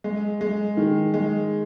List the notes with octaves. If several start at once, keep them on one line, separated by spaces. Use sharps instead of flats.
G#3
G#3
D#3
G#3